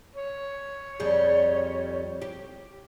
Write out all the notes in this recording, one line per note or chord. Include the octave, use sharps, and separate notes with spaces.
C#5
F2 G3 G#4
G4